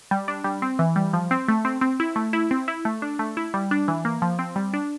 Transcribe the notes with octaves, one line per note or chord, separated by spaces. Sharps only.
G3
D4
G3
C4
E3
G3
F3
C4
A3
C4
C4
E4
A3
E4
C4
E4
A3
D4
A3
E4
G3
D4
E3
A#3
F3
C4
G3
D4